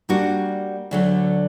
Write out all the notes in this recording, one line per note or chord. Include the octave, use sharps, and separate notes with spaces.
G3 A#3 D4 F#4
D2 D3 F#3 A3